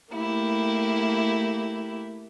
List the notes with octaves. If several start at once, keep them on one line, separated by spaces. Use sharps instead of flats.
A3 A#3 E4 G4